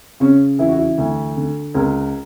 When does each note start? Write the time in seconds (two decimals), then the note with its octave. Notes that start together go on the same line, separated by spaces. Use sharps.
0.20 C#3 C#4
0.59 E3 E4
0.69 F#4
0.78 E4
0.98 D2
1.36 D3
1.74 C#2 A#4